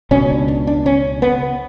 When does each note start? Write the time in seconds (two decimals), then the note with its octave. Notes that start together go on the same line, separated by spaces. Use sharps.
0.11 C#2 B2 C#4
0.30 D4
0.48 D4
0.67 D4
0.86 C#4
1.22 B3